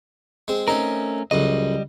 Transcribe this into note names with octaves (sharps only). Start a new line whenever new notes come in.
G#3 C4
A3 C4 C#4 D#4 A#4 D#5
C#2 F#2 A2 G3 D#5